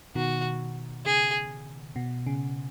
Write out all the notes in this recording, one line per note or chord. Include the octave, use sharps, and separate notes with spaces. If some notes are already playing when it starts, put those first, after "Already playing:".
B2 D#3 F#4
C#3 G#4
B2
C#3